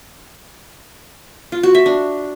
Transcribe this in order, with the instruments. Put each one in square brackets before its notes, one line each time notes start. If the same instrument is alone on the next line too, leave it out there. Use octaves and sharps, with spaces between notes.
[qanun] F4
F#4
E5
D4